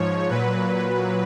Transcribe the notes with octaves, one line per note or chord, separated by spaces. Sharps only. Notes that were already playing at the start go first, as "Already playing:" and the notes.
Already playing: G#2 F3 C#5
A#2 F#3 B4